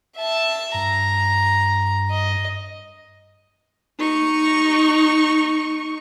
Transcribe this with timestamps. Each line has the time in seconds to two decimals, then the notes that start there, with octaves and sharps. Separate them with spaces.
0.17 E5 A5
0.74 G2 A#5
2.11 D#5
3.99 D#4 C#6